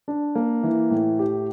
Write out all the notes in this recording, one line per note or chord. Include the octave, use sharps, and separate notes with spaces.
D4
A#3
E3
A2
G4